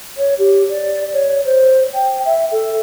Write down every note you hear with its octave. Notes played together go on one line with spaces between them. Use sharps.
C#5
G4
D5
C#5
C5
G5
E5
A4